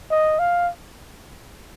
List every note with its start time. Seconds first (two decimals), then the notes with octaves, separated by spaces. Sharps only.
0.11 D#5
0.39 F5